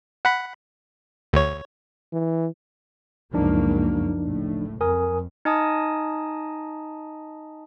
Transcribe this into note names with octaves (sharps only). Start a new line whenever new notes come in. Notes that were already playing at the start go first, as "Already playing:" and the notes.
F#5 B5
D2 C#5
E3
C#2 F#2 F3 A#3 D4 D#4
F#1 A2
F2 A#4 G#5 D#6
D#4 D#5 G#5 A5 D#6